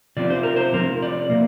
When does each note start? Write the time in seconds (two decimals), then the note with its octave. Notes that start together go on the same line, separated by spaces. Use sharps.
0.17 C3 F3 C4 D5
0.30 C5
0.43 A#4
0.56 C5
0.74 C3 F3 C4 A#4
1.02 D5
1.30 C3 A#3